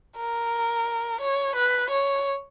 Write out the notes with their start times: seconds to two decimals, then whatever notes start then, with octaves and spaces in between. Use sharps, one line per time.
0.17 A#4
1.21 C#5
1.56 B4
1.90 C#5